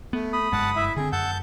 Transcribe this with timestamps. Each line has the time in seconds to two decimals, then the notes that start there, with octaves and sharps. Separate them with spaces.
0.13 A3 B3
0.33 B5 D#6
0.52 F#1 G2 G#3 F#5 A5
0.76 E4 E5
0.97 D3 C4 G#4
1.12 F#2 F#5 A5 E6 G6